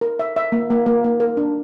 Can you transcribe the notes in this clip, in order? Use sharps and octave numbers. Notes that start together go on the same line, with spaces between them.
A#4
E5
E5
A#3
A#3
A#3
A#3
A#4
D4